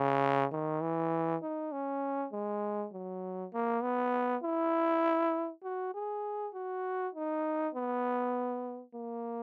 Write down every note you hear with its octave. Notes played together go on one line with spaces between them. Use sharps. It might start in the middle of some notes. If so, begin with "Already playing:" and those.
Already playing: C#3
D#3
E3
D#4
C#4
G#3
F#3
A#3
B3
E4
F#4
G#4
F#4
D#4
B3
A#3